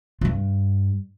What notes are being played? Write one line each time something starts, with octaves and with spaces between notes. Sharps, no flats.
G2 F4